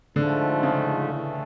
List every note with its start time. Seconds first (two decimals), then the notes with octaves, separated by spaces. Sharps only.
0.16 G#2 D3 F3 A3
0.63 C#3
1.10 A2 E3 A3